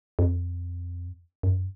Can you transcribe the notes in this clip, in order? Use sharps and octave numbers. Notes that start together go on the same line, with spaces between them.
F2
F#2